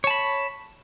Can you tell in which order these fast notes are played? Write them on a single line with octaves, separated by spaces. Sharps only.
C#5 A5 B5